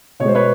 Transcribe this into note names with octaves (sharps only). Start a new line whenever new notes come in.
B2 G#3 C5 C#5
B4 C#5